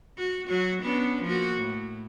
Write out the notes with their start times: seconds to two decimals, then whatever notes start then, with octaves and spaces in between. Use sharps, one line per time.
0.18 F#4
0.48 F#3 F#4
0.83 B3 C#4 D4
1.23 F3 A#3 F#4
1.57 A2